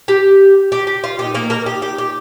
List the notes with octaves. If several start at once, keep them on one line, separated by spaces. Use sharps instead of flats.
G4
G4
G4
F4
A#2 A#3 D#4 G4
A#3 A#4
A#3 A#4
G4
G4
G4